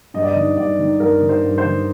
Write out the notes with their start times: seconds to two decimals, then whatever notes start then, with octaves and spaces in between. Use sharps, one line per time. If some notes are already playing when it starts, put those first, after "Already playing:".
0.14 G2 D#5
0.22 D5
0.29 D#5
0.36 D#3
0.57 G2 D5
0.79 D#3
1.00 G2 A#4
1.22 D#3
1.29 C5
1.43 G2
1.58 C5
1.65 D#3